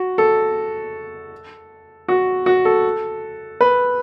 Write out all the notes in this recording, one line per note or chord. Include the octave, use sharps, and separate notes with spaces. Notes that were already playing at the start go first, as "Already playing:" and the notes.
Already playing: F#4
A4
F#4
F#4
A4
B4